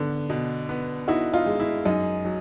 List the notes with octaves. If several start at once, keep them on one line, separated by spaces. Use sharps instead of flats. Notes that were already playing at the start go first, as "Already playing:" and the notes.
Already playing: D3 B3
B2
B3
D#4 E4 F#4
D#4 F4
G#3
E4
F#2 D#4
F#3